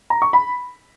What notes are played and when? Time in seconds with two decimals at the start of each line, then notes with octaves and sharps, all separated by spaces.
0.10 A#5
0.22 C#6
0.33 B5